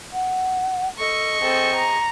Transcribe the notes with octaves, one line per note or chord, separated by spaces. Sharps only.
F#5
A4 D#5 C#6
C4 G#4 A4
A#5